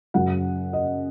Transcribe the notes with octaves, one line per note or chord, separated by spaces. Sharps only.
F#2 C#3 F#3 F#5
D#5